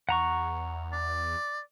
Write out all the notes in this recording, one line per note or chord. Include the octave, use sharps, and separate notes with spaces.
E2 F#5 A#5 C#6
D5